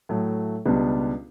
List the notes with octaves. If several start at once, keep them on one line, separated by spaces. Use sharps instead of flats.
A2 F#3 A3
C#2 B2 G3 B3 D4